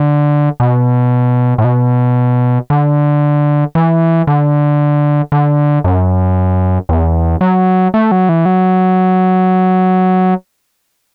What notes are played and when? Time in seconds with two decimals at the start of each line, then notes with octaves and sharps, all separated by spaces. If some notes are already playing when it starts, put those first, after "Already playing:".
Already playing: D3
0.60 B2
1.58 A2
1.64 B2
2.70 D3
3.75 E3
4.27 D3
5.32 D3
5.84 F#2
6.89 E2
7.41 F#3
7.94 A3
8.12 F#3
8.29 E3
8.45 F#3